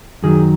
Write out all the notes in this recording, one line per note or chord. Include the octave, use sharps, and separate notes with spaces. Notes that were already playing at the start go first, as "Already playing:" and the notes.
F#2 D#3 F#3 G#4